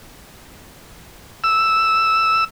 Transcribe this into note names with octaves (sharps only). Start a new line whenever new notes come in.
E6